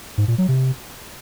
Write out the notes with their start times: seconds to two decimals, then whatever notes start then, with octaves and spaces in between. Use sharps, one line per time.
0.18 G#2
0.28 A#2
0.38 F#3
0.48 C3